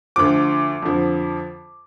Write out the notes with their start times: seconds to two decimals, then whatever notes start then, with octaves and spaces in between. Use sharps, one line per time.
0.16 D2 D3 F3 D6
0.82 F2 D3 F3